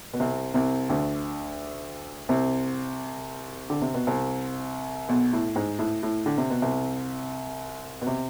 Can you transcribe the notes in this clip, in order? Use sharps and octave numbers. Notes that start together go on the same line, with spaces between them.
B2
C2 C3
C2 C3
D2 D3
C2 C3
D3
C3
B2
C2 C3
B1 B2
A2
G#2
A2
A2
D3
C3
B2
C2 C3
B2
C3